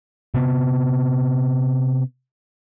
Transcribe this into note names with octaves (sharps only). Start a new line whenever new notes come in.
C3 B3